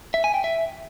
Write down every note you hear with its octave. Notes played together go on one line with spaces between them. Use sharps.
E5
G#5
G5
E5